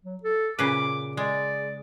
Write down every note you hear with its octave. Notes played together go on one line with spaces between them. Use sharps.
F#3
A4
A#2 C#3 B4 D6
G#3 D5